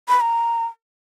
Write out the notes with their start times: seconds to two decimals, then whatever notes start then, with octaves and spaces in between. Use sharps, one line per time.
0.09 B5
0.21 A#5